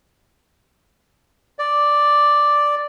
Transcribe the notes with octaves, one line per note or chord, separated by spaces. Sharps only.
D5